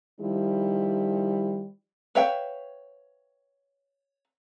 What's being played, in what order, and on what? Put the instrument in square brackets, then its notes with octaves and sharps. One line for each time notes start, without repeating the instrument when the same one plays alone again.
[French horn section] D#3 F3 G3 D#4 E4
[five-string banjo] B4 C#5 E5 F5 G5